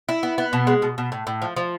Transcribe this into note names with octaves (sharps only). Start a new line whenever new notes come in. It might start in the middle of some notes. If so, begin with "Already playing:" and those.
E4
B3
B3
B2
G#3
B2
B2
A2
A2
F3
F3